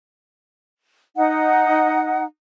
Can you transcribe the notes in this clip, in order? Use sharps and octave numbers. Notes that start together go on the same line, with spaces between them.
D#4 F#5